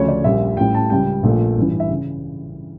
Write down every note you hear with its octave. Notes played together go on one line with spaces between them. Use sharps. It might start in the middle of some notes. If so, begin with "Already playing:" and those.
Already playing: D2 C#3 F3 A3 C#5
D5
A#1 A#2 G3 E5
A1 A2 G3 G5
A5
C#2 C#3 G3 G5
A#1 A#2 A3
A1 G2 E3
E5
C#3